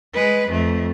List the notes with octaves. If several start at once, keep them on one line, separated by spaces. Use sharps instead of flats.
G#3 B4
F2 A3